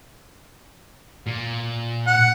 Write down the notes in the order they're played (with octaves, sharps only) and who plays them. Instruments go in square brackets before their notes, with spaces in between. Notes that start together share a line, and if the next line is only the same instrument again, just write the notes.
[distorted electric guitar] A#2
[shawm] F#5